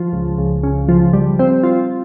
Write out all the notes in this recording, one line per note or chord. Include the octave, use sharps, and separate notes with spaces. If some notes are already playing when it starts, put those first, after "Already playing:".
Already playing: F3
C#2
C#2
C#3
F3
G3
C4
F4